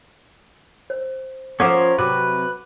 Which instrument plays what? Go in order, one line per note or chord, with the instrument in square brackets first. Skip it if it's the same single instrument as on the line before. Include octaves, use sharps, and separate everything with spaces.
[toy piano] C5
[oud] F3 C5 [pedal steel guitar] C#4 F4 A#4 [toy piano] A4 F#5 D6
[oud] C3 F#3 [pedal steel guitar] B4 [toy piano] D6